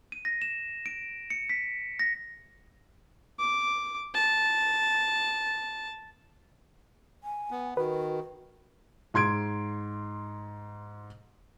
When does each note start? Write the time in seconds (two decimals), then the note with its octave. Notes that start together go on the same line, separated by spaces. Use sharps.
0.12 D#7
0.25 A#6
0.42 E7
0.86 D7
1.30 C#7
1.50 B6
1.99 A#6
3.40 D6
4.15 A5
7.24 G#5
7.51 B3
7.77 D#3 F#4 B4
9.14 G#2 C6 G#6 D7